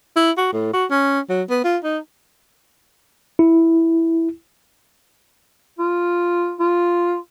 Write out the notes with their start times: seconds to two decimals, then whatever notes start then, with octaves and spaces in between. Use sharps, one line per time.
0.16 E4
0.37 F#4
0.53 A2
0.73 F#4
0.90 C#4
1.29 F#3
1.50 B3
1.64 F4
1.83 D#4
3.39 E4
5.79 F4
6.60 F4